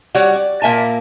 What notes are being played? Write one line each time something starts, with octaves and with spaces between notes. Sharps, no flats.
G3 F#4 C#5 D5 F#5
D5
A#2 A#3 E5 G#5 A5